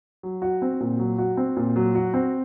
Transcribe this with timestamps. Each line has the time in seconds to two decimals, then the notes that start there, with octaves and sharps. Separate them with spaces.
0.23 F#3
0.42 F#4
0.62 C4
0.80 A#2
0.99 F#3
1.18 F#4
1.37 C4
1.57 A#2
1.76 F#3
1.95 F#4
2.14 C4